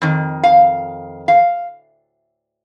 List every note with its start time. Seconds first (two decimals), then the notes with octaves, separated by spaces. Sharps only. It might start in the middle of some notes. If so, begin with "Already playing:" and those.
0.02 F2 D#3
0.43 F5
1.28 F5